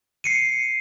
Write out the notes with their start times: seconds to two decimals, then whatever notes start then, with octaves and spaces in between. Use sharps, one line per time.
0.24 C7 C#7 D#7